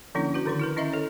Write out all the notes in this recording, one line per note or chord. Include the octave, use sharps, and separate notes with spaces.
D3 F3 A#3 C#4 D4 E4
F#4 B4
D3 D#3 F3 C6
E4 A#4 B4
D#3 C#4 E4 D#5 E5 A#5
A4 C#5